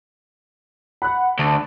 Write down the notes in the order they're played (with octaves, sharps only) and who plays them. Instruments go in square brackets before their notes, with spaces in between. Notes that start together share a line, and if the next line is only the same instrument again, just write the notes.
[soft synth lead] F#5 [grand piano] B5 F#6
[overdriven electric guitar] D2 [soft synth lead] A5